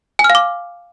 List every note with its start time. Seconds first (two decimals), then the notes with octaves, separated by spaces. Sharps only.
0.19 G#5
0.24 F6
0.30 F5
0.35 D6